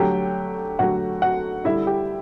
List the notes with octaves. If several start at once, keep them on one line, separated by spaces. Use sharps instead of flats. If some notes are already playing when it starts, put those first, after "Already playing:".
Already playing: D3 F#3 A3 G4 G5
D3 F#3 A3 F#4 F#5
F#4 F#5
D3 G3 E4 E5
G4 G5